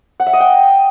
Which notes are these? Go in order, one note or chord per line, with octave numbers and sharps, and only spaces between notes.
F#5
E5
D#5
G5